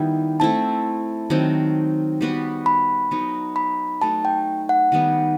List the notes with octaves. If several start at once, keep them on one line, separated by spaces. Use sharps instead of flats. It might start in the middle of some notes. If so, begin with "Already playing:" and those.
Already playing: D#3 G3 B3 E4 G5
A3 C4 E4 A5
D#3 F#3 C4
G3 B3 F#4 B4
B5
F#3 B3 D#4
B5
F#3 A3 D#4 A5
G5
F#5
D#3 G3 B3